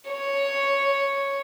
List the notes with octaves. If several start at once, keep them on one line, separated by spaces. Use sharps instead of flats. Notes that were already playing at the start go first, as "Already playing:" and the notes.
C#5